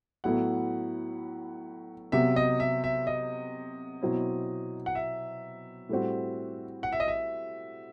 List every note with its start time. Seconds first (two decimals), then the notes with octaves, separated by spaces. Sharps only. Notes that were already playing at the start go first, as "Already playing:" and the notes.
0.24 A2 F#3 B3 E4 F#5
2.12 C3 F#3 B3 E5
2.36 D#5
2.60 E5
2.84 E5
3.07 D#5
4.02 B2 F#3 C4 E4
4.86 F#5
4.95 E5
5.89 A2 G3 C4 F#4
6.83 F#5
6.92 E5
7.00 D#5
7.08 E5